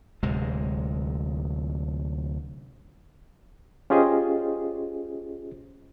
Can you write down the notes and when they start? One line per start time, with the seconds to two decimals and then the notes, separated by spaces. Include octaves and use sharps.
0.23 D1 C3 G#3
3.90 C#4 F4 G4 G#4 C5 D#5